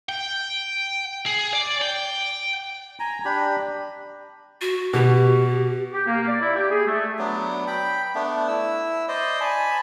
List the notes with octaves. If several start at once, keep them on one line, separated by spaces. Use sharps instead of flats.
G5
G#4
D5
G5
G#5 A#5
D4 G4 B5
F#4
B2 G4
G4
A#3
D5
E4
G4
G#4
A3
F#3 B3 D4
G5 B5
A3 B3 D4
E4 E6
C5 D5 D#5
G#5 A5 B5